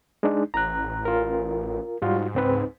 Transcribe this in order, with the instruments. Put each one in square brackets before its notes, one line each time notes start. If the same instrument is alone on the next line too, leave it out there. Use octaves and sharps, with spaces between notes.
[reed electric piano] G#3 D4 D#4
[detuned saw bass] A1 [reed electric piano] A#5 F#6
[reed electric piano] F4 A#4
[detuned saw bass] G#2 [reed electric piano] G3 F4 F#4
[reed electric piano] C#2 C4 B4